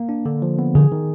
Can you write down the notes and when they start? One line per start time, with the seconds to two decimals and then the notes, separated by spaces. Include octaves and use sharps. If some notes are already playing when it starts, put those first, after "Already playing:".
Already playing: A#3
0.09 D4
0.25 D3
0.42 F3
0.59 B3
0.75 D3 F3 G#4
0.92 D#3